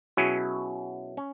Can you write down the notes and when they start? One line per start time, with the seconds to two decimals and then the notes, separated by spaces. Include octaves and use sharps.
0.17 B2 F#3 C#4 E4 G#4
1.17 C#4